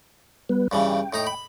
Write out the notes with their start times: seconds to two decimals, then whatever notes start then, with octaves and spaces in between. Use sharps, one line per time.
0.49 G3 B3 B4
0.72 G2 C#3 E3 G5
1.13 A2 D#4 A#5
1.27 B5